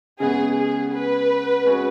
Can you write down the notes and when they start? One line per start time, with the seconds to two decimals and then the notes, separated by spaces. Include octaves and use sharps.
0.20 C#3 G#3 B3 G#4
0.56 G#4
0.93 B4
1.65 G#3 C#4 F#4